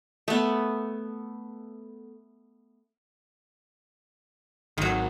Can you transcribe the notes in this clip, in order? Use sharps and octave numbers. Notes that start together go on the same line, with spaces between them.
A3 B3
G#1 D#3 F#3